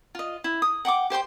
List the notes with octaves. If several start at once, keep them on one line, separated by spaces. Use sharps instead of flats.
F4 D#5
E4
D#6
F#5 G5 C#6 D6
G4 C5 G5 C6